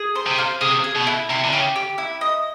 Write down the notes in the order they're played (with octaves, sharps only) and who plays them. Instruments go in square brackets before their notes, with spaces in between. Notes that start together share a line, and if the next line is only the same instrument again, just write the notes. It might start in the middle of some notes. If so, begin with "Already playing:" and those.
Already playing: [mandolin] G#4
C5
[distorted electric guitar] C3
[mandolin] F5
[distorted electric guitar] C3 [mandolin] G#4
[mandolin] G#4
[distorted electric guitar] B2
[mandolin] E4
[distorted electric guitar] C3 [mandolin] E4
[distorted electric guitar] D3
[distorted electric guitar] C#3 [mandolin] G4
[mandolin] G4
E4
D#5